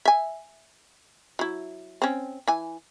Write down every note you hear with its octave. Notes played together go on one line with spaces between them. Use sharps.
E5 G#5
F#3 E4
C4 C#4
E3 G#5